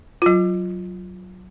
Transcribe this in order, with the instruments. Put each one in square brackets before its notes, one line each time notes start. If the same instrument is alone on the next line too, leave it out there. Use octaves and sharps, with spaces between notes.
[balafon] F#3 F4